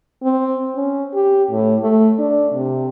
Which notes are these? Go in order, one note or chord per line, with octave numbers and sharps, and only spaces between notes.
C4
C#4
G4
A2
A3
D4
C3